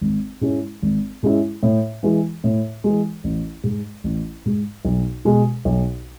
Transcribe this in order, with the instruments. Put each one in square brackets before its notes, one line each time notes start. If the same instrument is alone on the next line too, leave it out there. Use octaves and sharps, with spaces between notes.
[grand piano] G#1
G#2 G#3 C#4 E4
G#1
G#2 G#3 C#4 E4
A2
E3 G#3
A2
E3 G#3
A1
G#2 G#3
A1
G#2 G#3
B1
B2 G#3
B1